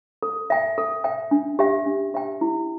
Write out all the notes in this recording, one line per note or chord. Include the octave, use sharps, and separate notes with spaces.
A4
E5 G5
A4
E5 G5
D4
G4 E5 G5
D4
G4 E5 G5
E4